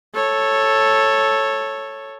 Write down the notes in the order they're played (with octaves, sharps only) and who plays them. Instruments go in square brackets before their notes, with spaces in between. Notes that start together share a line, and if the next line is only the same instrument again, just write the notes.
[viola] A4 C#5